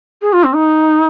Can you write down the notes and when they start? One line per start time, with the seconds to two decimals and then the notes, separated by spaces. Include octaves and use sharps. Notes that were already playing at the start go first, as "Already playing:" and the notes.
0.22 G#4
0.33 F4
0.44 C4
0.55 D#4